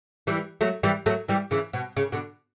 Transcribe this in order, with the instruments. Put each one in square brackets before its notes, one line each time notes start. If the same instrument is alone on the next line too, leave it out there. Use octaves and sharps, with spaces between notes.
[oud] E3 G3
F#3 A3
E3 G3
F#3 A3
E3 G3
C#3 E3
B2
C#3
B2 D3